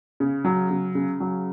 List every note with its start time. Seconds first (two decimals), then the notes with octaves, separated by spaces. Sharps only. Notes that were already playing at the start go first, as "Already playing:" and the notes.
0.20 C#3
0.45 F#3
0.70 C#3
0.95 C#3
1.20 F#3